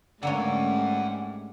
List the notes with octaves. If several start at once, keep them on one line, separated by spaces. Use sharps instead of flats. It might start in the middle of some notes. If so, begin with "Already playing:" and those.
G#2 D3 G3 A3 A#3 C#4 F#5 G#5